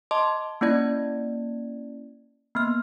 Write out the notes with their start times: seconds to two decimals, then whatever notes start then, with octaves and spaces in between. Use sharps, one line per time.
0.11 D#5 A5 C6 D6
0.61 A#3 C#4 E4 D5 G#6
2.55 A#3 B3 F6